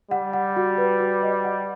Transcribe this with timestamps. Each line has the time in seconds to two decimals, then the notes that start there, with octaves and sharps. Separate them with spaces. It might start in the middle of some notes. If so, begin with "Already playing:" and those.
0.11 G3 F#5
0.33 F#5
0.57 F#4
0.78 B4
1.00 F#4
1.23 D#5
1.44 F#5